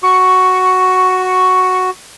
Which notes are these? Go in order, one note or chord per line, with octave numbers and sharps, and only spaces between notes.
F#4 C#6